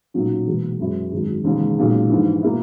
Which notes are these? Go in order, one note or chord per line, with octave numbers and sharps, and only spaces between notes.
B1 A#2 F#3 C#4
E1 E2 B2 A#3
F#2 E3 G#3 C#4 E4
G#1 F#2 D#3 G#3 D#4
E1 D#2 C#3 G#3
B1 A#2 G#3 C#4
A#1 G#2 E3
B2 A#3 E4